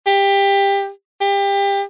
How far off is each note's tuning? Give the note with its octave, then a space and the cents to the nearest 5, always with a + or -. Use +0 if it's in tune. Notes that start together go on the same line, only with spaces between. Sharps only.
G4 +20
G4 +25